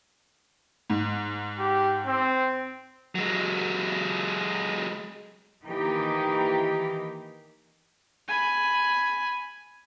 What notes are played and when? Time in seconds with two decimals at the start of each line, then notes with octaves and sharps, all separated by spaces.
0.90 G#2
1.59 G4
2.07 C4
3.15 F#3 G#3
5.63 D#3 E3 A#3 D#4 G4
8.28 G#5 B5